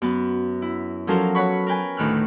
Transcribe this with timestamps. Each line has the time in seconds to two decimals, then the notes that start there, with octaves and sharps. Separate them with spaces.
0.02 F#2 B3
0.62 E4
1.07 F3 F#3 C#4 A4 A#4 C5
1.35 B4 C#5 F#5 B5 C#6
1.67 A#4 B4 G5 G#5
1.97 D2 A2 D#3 F6 F#6